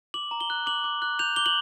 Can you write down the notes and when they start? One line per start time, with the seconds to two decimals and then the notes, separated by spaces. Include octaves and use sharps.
0.14 D6 F#7
0.31 A#5
0.40 G7
0.50 F#6
0.66 D6 F#7
0.84 D6
1.02 F#6
1.19 G6 F7
1.36 D6 G7
1.46 F#7